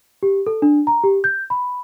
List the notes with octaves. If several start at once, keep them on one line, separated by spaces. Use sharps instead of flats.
G4
A4
D4
A#5
G4
G6
B5